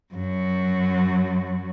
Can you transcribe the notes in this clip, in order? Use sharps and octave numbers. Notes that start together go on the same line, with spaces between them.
F#2 F#3